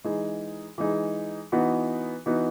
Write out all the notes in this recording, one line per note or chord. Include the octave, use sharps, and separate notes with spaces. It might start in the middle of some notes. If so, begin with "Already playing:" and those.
E3 G#3 D#4 G#4
E3 G#3 D#4 G#4
E3 B3 D#4 F#4
E3 B3 D#4 F#4